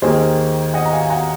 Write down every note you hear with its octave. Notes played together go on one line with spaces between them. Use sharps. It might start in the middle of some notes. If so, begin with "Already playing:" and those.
D#2 D#3 A#3 G#4 C5
D#5 F#5
A#5
F5 G#5
F#5 A#5